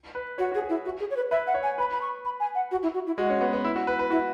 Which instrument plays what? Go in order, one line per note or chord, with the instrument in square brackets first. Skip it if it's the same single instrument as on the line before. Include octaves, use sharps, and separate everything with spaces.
[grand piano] B4
[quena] F#4 [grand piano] C#5
[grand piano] F#4 [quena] G#4
[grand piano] G#4
[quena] E4
F#4
G#4
C#5
B4
[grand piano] B4 [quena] E5
[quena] F#5
[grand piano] C#5
[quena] G#5
[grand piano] B4 [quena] B5
[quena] B5
C#6
B5
G#5
F#5
F#4
E4
F#4
E4
[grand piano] G#3 [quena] F#4
[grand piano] C#4
B3
B3
E4
F#4
B4
B4
[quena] E4 [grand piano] F#4